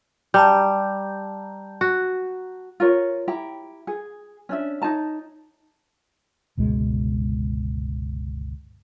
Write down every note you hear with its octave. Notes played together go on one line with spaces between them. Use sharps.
G3 A5 A#5 G6
F#4
F4 A#4 C#5
E4 G4 A#5
G#4
C#4 D4 E5
D#4 C#5 A5 A#5
G1 C#2 B2 G#3